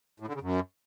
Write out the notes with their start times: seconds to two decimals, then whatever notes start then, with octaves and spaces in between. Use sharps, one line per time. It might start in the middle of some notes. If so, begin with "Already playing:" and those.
0.20 A2
0.27 D3
0.34 C#3
0.42 F#2